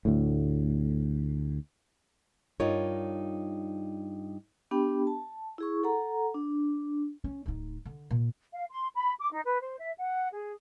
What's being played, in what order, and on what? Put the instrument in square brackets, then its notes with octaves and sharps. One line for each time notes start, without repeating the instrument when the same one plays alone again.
[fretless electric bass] D2 A2
[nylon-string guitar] G2 D#4 F4 A#4 C#5
[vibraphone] B3 D4 G4 G5 B5
A5
E4 G#4 C#6
A4 F#5 A#5
D4
[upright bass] C#4
D1 D#4
D3
A#2
[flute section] F5
C6
B5
D6
D#4
B4
C5
E5
F#5
G#4